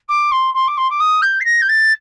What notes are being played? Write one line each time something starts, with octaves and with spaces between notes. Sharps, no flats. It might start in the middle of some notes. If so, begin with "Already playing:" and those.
D6
C6
C6
D6
C6
D6
D#6
G6
C7
A#6
G6
A6